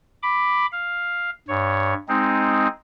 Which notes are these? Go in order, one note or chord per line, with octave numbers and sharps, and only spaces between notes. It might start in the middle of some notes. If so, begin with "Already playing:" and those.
B5 D6
F5
G2 C#5
G#3 C4 D#4